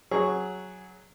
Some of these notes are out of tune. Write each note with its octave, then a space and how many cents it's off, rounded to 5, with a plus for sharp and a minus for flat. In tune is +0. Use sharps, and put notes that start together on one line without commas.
F#3 +0 G#4 +0 C#6 +0